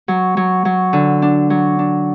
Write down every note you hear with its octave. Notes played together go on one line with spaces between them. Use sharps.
F#3
F#3
F#3
D3
D4
F#3
D4